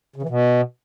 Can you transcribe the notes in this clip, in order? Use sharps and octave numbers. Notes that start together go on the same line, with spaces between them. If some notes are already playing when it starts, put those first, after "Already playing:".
C#3
E3
B2